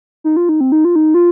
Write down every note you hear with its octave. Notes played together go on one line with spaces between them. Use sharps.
D#4
F4
D#4
C4
D#4
F4
D#4
F4